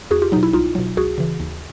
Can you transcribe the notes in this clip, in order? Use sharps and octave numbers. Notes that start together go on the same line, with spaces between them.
E2 F#4 G#4
F4 G4
B2 F#3 D#4
E4
C2 D#4 F4
B2 F#3
C#2 F#4 G#4
C#3 E3
D#2